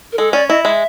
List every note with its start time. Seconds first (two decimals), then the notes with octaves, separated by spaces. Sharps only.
0.12 A#4
0.18 G#3 A4
0.33 C#4 D5
0.49 E4 D#5
0.65 G#3 E5